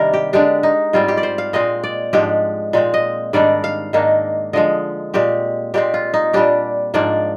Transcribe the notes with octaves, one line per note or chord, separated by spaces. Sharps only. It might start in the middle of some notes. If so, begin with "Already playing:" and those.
Already playing: C3 D#3 G3 D4 A#4
G4
D3 G#3 D4 G4
D#4
G#2 G3 C4 F4
G4
D5
C5
F5
A#2 G#3 C4 D#5
D5
G#2 F3 G#3 D4 G4
A#2 G#3 C4
D#5
G#2 D#3 G3 D4 D5
F5
G#2 D#3 A#3 D4
D3 F3 G#3 D#5
A#2 G#3 C4 G4
A#2 G#3 C4 G4
F4
D#4
A#2 G3 D4 G4
G#2 F3 A#3 D4 D5